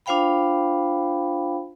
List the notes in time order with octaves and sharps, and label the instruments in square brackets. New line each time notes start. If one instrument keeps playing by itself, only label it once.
[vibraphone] D4 F4 C5 F5 G5 B5